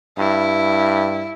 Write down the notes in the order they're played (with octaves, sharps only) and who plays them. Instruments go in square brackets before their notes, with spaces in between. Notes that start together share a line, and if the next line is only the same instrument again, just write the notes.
[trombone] G2 [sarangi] E4